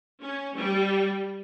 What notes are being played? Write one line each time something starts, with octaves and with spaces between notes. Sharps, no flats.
C#4
G3